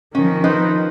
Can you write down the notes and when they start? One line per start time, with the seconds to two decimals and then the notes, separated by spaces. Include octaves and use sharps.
0.15 D#3 F3 C#4
0.44 D#4 B4 C5